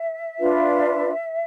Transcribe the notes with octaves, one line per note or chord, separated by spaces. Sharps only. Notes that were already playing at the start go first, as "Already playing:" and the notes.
Already playing: E5
D4 F4 B4